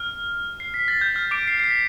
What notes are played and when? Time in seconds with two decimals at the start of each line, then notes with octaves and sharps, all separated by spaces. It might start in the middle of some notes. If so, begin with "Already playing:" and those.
Already playing: F6
0.60 C7
0.74 B6
0.88 A6
1.01 G6
1.16 F6
1.31 D6 D7
1.48 C7
1.60 C7
1.64 B6